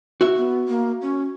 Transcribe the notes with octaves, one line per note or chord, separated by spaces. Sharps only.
F#4 E5
B3
A#3
C#4